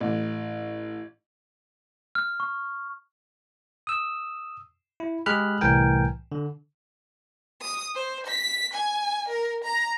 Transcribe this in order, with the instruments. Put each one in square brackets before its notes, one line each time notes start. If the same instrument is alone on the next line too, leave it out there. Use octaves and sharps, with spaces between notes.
[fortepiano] A1
[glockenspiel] F6
C#6
[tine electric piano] D#6 E6
E4
G#3 G4 G#4 B5 F6 F#6
C2 A2 E3 A#4 G5 G#5
D3
[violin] D#6
C5
B6
G#5
A#4
A#5